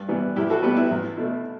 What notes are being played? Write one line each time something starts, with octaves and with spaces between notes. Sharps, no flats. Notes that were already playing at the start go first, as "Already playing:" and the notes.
Already playing: G2
E3 G3 B3
E2 E4 G4
F#4 A4
B2 G3 B3 G4 B4
E4
E2
B2 A3